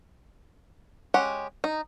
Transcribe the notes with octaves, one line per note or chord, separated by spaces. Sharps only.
G#3 C#4 G4 F#5
D#4